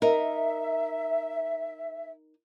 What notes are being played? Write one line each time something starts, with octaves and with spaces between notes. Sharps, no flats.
D#4 A#4 E5